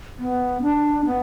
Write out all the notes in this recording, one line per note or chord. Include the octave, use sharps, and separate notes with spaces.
B3
D4
B3